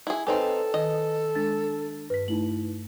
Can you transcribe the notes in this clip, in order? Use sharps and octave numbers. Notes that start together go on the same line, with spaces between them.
E4 G#4
C4 D#4 G4 A4 B4 C#5 G#5
D#3 D#5
G#3 D4 A6
G2 B4 B6
A3 D#4 E4 F#7